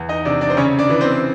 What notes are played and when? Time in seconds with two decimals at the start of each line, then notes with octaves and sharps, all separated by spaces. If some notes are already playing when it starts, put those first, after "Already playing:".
Already playing: E2
0.09 D#4 D#5
0.25 C3 D4 D5
0.41 D4 D5
0.50 C5
0.57 C#3 C#4 C#5
0.79 D4 D5
0.90 E3
1.01 C4 C5